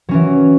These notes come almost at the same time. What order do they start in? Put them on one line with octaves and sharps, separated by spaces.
F#3 C#4 E3